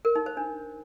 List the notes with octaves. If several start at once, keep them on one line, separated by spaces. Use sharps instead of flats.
A#4
D#4
C5
D4